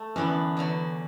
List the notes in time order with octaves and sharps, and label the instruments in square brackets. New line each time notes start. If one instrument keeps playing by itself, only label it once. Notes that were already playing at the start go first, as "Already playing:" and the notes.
Already playing: [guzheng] A3
[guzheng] F#2 D3 B3 D4 [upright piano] E3
[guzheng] E2 D3 F#3